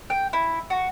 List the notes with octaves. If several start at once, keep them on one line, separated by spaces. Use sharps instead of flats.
G5
E4
F#4